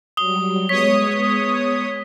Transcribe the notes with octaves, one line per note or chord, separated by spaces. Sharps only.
F#3 G3 D#6 G7
G#3 B3 C#5 D#6 B6